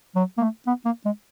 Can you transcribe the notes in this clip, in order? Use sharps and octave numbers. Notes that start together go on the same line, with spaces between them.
F#3
A#3
A3
B3
A#3
G#3